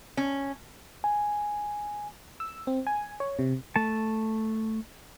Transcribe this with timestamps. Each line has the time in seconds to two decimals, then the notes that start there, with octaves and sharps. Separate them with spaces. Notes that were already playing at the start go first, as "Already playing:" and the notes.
0.17 C#4
1.04 G#5
2.40 E6
2.67 C4
2.87 G#5
3.20 C#5
3.39 C3
3.76 A3 A5